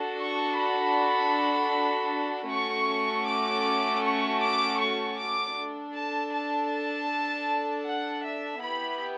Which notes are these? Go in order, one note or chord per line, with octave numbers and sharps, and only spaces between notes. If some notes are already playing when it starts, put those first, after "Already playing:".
Already playing: D4 F#4 A4
C#6
B5
A3 C#4 F#4 A4 C#6
D6
C#6
D6
C#6
D6
D4 A4
A5
A5
A5
F#5
E5
B3 E4 G4 B5